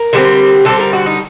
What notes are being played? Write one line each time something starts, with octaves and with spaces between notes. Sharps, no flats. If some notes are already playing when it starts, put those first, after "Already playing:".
Already playing: A#4
D3 G3 C4
D3 G3 C4 A4
A#4
F#4
D#4